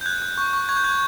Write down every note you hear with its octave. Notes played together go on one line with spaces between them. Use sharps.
G6
F#6 G#6
F#6
C#6 G6
C#6
C#6 G#6
G6
F#6 G#6